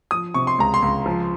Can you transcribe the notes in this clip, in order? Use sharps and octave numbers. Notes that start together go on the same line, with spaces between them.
F3 D#6
C3 C#6
C6
C#2 A#5
C6
C#2
F3